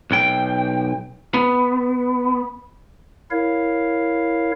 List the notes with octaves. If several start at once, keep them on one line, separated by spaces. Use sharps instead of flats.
B1 G5
B3
E4 A#4 C#5 F5